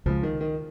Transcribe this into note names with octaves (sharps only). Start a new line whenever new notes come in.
C#2 C#3 F3 G#3
D#3
D#3